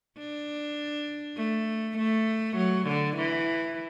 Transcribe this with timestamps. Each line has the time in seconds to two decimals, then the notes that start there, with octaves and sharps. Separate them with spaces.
0.18 D4
1.37 A3
1.98 A3
2.57 F#3
2.87 D3
3.17 E3